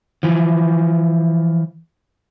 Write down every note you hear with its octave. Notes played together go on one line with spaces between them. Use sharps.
E3 F3